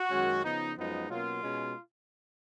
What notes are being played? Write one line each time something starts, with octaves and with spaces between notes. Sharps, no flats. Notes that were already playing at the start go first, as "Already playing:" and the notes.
Already playing: F#4
F#2 D#3 G#3 C#4
C#3 F3 B3 D#4
F#2 F3 G#3 B3 D#4
B2 F#3 A#3 C#4 F4
B2 G#3 C#4